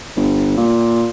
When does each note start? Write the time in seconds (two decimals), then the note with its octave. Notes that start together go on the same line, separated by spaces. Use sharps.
0.16 G1
0.58 A#2